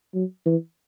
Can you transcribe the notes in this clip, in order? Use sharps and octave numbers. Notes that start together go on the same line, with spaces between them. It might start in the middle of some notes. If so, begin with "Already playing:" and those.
F#3
E3